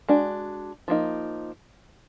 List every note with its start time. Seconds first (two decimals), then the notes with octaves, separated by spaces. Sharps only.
0.08 G#3 D4 F#4
0.88 F3 A#3 D#4